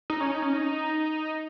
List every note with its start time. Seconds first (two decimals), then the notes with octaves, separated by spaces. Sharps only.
0.10 D#4
0.20 C#4
0.32 D#4
0.42 C#4
0.53 D#4